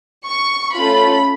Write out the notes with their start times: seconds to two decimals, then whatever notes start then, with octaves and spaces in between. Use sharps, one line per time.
0.27 C#6
0.76 A3 C#4 F4 A4 B5